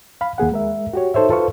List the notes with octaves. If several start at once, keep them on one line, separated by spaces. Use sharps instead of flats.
F5 B5
D#2 A#3 G#4 F#5
G#3 A#4 E5
F#4 G4 C#5
D#4 A4 C5 C#5 E5
F4 A4 B4 C5 F5 C#6